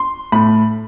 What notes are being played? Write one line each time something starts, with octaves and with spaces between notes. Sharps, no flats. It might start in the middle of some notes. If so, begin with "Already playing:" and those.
Already playing: C6
A2 B5